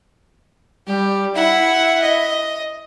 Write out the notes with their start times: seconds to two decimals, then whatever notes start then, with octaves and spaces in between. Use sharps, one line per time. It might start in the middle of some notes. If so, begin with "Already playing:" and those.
0.87 G3 G4
1.35 E4 E5 F#5
2.02 D#5